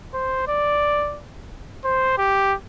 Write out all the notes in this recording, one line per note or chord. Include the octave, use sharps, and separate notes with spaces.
C5
D5
C5
G4